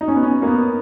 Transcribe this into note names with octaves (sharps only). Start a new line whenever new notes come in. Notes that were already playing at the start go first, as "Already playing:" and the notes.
D#4
C#4
B3
C#4
A#3
B3